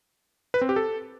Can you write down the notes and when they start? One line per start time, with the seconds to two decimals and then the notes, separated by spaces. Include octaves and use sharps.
0.54 B4
0.61 C4
0.69 G4
0.76 A4